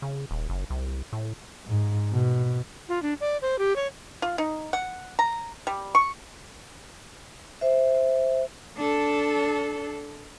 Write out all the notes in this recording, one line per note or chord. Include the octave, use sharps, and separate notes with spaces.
C#3
D#1
F#1
C2
A2
G#2
B2
F4
D4
D5
C5
G4
C#5
F4
D#4
F#5
A#5
G3
C#6
C5 E5
D4 A4